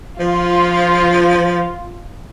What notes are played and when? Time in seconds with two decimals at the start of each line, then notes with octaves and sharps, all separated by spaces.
0.20 F3 F4